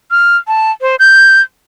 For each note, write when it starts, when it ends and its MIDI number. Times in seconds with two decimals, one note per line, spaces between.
0.11 0.37 89
0.48 0.71 81
0.81 0.96 72
0.99 1.41 91